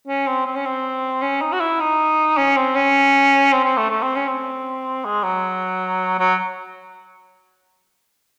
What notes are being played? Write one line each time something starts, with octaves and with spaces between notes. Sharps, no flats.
C#4
C4
C4
C#4
C4
C#4
D#4
F#4
E4
D#4
C#4
C4
C#4
C4
C4
A3
A3
C4
C#4
C4
G#3
F#3
F#3